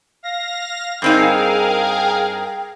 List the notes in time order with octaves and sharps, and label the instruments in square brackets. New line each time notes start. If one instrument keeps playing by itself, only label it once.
[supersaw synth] F5 A#6
[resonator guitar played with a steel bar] G2 C4 D#4 [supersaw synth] G#4 A#4 F5 [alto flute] G5